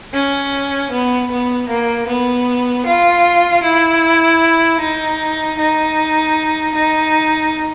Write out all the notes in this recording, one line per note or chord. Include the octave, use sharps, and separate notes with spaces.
C#4
B3
B3
A#3
B3
F4
E4
D#4
D#4
D#4